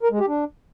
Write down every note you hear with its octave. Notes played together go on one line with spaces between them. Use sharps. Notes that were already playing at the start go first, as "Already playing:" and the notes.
A#4
G#3
G4
D4